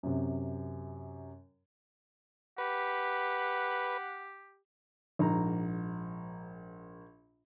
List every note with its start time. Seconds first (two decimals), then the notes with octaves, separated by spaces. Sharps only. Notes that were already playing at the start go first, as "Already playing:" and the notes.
0.03 F#2 C3
2.58 G4 B4 F#5
5.19 A#1 G#2 A#5